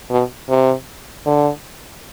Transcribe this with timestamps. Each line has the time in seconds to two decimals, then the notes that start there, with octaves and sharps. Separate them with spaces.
0.10 B2
0.49 C3
1.26 D3